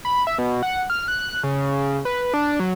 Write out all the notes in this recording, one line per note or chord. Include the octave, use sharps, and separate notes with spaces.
B5
E5
B2
F#5
F6
F#6
C#3
B4
D4
F#3